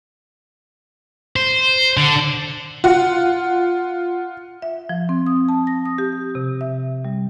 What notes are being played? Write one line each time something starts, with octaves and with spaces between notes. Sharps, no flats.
C5
D3
F4 F#5
E5
F3
C4
D#6
A5
A#6
D#6
G4
C3
E5
G3